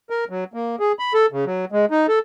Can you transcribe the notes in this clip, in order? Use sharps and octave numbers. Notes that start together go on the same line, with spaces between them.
A#4
F#3
A#3
G#4
B5
A4
C#3
F#3
G#3
D#4
A4